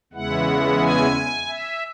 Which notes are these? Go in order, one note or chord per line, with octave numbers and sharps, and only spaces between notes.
E2 C#3 G#3 B3 E4 F#5
G#5
E5